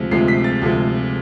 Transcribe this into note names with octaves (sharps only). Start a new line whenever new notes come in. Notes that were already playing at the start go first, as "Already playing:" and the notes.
Already playing: D2 C3 F3 G#3
D2 C3 F3 G#3 C7
B6
A6
D2 C3 F3 G#3